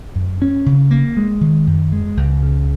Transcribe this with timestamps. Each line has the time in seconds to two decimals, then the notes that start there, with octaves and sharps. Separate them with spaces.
0.16 F#2
0.42 C#4
0.66 C#3
0.91 A#3
1.17 G#3
1.41 D#3
1.67 F#2
1.92 G#3
2.17 C#2
2.43 C#3